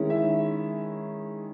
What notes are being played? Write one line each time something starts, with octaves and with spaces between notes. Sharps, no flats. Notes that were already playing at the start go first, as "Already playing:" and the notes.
Already playing: D#3 G#3 C#4 E4
E5